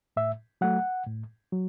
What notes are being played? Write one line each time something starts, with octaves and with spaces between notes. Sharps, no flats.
A2 E5
F#3 A3 F#5
A2
F#3